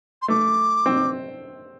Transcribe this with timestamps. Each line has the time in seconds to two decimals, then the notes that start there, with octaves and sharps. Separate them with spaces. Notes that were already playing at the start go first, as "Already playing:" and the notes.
0.22 C6
0.28 A3 D6
0.86 C4